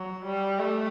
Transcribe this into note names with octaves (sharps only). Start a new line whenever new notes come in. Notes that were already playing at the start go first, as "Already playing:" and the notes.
Already playing: F#3
G3
A3